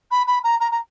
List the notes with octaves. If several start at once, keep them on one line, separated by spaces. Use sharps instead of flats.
B5
B5
A#5
A#5
A#5